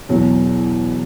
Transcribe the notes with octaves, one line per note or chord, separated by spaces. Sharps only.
E2 B2 F#3